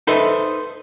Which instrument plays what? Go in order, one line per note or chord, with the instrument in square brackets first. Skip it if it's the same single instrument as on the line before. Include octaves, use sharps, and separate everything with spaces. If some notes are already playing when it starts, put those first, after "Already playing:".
[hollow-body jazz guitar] D#4 A4 B4 C5 D#5 E5